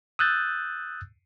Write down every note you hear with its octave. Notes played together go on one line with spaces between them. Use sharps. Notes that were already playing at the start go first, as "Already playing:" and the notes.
D#6 E6 F#6 G6 A6